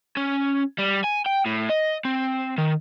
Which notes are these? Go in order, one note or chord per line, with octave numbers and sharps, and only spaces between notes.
C#4
G3
G#5
G5
A2
D#5
C4
D#3